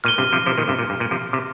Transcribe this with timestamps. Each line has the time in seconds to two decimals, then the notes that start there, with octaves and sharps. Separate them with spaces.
0.04 A#2 F6 D#7 G7
0.18 G2 C3
0.33 C3 F3
0.46 C3 F3
0.58 A#2 D#3
0.68 G2 C3
0.79 A#2
0.90 G2
1.00 A#2
1.11 C3 F3
1.33 C3